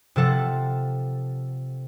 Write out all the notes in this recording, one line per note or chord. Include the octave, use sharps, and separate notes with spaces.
C3 F3 A4 F#5